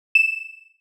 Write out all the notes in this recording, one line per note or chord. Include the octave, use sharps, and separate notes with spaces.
E7